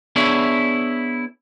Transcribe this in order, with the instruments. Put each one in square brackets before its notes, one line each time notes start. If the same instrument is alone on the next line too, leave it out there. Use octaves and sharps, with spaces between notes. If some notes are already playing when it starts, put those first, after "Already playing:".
[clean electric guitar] B3 D4 E4 G#4 C#5 E5